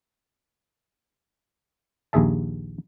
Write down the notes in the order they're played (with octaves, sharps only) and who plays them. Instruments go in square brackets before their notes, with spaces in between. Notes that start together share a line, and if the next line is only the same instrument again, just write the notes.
[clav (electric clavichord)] A#1 D#2 G#4 E5 A5